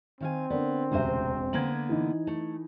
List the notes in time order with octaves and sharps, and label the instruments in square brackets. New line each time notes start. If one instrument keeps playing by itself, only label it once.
[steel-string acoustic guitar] D#3 F5 G#5 [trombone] C4
[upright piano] D3 A#4 D5 [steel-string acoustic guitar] B3
[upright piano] E1 A1 E5 [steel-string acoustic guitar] D2 C3 C5
[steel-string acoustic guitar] D3 A#3 B3 [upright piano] G#6 F#7
[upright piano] E3 D#4
[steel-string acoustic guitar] A3